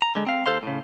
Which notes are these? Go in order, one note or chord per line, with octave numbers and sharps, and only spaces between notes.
A#5
D3 G#3
C4 F5
D#2 A4 C5 F5 C6
A2 C#3